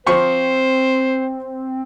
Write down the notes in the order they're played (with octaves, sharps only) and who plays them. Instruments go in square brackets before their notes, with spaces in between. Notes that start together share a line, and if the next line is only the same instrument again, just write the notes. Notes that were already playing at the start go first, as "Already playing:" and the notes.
[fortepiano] F3 C#6 [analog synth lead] C4 [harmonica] C5